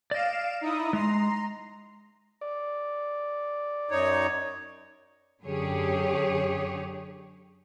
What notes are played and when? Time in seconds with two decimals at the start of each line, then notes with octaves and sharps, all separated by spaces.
0.11 D5 D#5 F5 D7 E7
0.61 D#4 E4 D#6
0.93 G#3 A#5 C6
2.41 D5
3.91 F#2 D#4 C#5
5.44 F#2 D3 G4 G#4 C#5